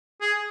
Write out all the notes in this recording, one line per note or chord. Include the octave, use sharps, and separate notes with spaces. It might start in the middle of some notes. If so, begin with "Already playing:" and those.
G#4